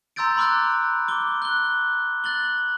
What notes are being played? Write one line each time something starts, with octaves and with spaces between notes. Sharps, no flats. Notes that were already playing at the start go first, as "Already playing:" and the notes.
A#5 C6 E6 G6 A6 D7
B5 C6 D6 F6 F#6 A6
D6 G7
F#6 G7
F#6 A6 F#7 G7